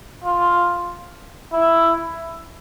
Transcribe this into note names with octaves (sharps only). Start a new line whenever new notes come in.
F4
E4